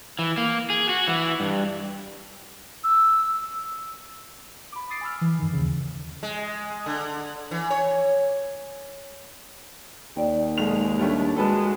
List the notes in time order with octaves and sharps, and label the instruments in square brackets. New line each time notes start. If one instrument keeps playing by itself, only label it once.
[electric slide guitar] E3
A#3
G#4
F#4
E3
G2
[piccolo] E6
[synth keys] B5 D6
D6 D#6 A6 C7 D7
G#5 B5 E6 F6
E3
G2 D#3
D#2 C#3
[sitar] G#3
D3
E3
C#5
[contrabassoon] D#2 [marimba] D5 G5
[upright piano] B1 F7 [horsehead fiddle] G#3
[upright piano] G3 A3 C#4 [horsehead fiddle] D4
[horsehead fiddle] G#3 F#4 [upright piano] A4 B4 A5